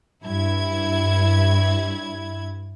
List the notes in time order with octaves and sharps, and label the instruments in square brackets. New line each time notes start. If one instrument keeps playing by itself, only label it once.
[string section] G2 E4 G#6